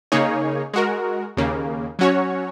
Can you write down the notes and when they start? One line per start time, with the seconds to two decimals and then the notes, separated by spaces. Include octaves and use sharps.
0.12 C#3 A#3 D#4 G#4 C#5
0.74 G#3 F#4 A#4
1.37 D#2 C#3 A#3
1.99 F#3 C#4 F#4 C#5